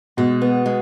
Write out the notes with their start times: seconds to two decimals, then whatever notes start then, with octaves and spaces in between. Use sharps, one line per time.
0.17 B2 G#3
0.41 B3
0.66 G#3